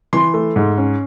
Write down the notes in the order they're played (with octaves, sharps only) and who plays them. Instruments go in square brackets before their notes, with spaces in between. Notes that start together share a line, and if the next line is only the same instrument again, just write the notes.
[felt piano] E3 C6
A3
G#2
C#4